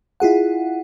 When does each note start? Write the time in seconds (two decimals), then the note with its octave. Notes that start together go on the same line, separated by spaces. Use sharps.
0.20 E4 F4 G#4 F#5